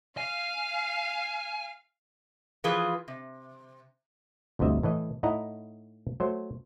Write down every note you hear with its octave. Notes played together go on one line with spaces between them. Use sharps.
F5 G#5
E3 F3 F4 G#4 B4
C3
G1 D2 C3 D#5 E5
A2 E3 D#5
A2 D#4 E4 D#5 F#5 A#5
F#3 A3 C5